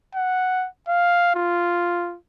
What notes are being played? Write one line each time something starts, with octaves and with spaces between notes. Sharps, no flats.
F#5
F5
F4